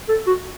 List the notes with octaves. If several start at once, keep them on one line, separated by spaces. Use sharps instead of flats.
A4
F#4